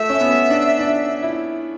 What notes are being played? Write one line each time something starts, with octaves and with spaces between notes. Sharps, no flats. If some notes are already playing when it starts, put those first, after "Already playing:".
Already playing: A3 E5
C#4
B3
D4
D4
E4